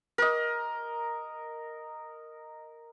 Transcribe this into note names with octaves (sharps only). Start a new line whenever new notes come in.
A#4 D#5